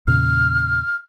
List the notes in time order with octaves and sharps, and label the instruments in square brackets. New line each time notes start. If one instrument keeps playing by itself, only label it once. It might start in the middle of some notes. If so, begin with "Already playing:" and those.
[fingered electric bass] E2 A#2 C#3 [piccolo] F6